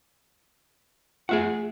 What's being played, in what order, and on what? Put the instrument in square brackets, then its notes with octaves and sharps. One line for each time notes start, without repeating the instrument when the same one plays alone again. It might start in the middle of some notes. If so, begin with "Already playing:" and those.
[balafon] A3 F4 [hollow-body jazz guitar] G#4 E5 F#5